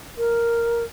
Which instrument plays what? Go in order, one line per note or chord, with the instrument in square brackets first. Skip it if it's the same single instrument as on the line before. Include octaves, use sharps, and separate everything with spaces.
[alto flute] A#4